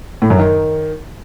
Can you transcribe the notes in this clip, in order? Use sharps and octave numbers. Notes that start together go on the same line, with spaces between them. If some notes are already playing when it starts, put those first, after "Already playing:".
A2
F#2
D#3